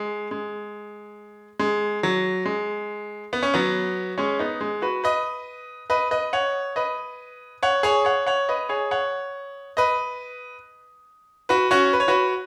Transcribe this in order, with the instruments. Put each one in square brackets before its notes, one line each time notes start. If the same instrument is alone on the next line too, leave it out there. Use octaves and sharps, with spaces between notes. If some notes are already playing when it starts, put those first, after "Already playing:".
Already playing: [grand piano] G#3
G#3
G#3
F#3
G#3
B3
C#4
F#3 B3
G#3 C#4
B3 D#4
G#3
F#4 B4
B4 D#5
B4 D#5
B4 D#5
C#5 F#5
B4 D#5
C#5 F#5
G#4 C#5
C#5 F#5
C#5 F#5
B4 D#5
G#4 C#5
C#5 F#5
B4 D#5
F#4 B4
C#4 F#4
B4
C#5
F#4 B4